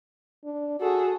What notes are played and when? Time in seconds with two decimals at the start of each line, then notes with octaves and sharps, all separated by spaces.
0.44 D4
0.80 F#4 G#4 A4